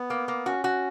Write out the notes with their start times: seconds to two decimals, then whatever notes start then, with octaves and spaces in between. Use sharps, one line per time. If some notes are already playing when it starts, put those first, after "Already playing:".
Already playing: B3
0.10 A#3
0.28 A#3
0.46 C#4 F#4
0.64 F#4